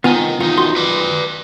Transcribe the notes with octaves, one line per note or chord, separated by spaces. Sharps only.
C2 D#3 B3 D#4 F4 G#5
E2 D#3 D#4 F4 F#5
F#4 C6
B4 D5